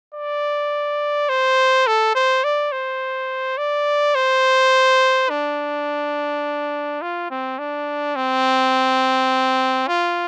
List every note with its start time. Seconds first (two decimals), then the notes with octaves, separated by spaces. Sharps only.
0.14 D5
1.29 C5
1.87 A4
2.15 C5
2.44 D5
2.72 C5
3.58 D5
4.15 C5
5.30 D4
7.02 F4
7.30 C4
7.59 D4
8.16 C4
9.87 F4